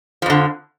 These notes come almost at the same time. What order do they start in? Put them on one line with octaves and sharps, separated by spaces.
F3 F2 D3